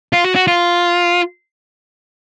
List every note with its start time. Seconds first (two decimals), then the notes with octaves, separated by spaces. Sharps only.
0.13 F4
0.24 F#4
0.36 F#4
0.47 F4